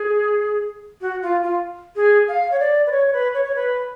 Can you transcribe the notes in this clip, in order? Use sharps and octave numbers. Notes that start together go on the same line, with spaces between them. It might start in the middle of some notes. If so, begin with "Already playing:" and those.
Already playing: G#4
F#4
F4
F4
G#4
F5
C#5
D5
B4
C#5
C#5
B4
C#5
C#5
B4